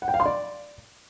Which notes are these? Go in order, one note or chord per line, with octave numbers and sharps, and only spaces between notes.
F#5
G5
F5
C6
D5